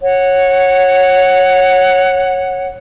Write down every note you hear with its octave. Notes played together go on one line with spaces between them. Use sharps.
C#5 F#5